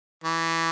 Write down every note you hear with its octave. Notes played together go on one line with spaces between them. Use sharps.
E3